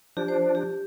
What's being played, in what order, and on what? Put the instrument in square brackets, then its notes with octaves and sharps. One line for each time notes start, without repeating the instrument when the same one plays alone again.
[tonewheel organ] F3 D4 [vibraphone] G4
[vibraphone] C5
G4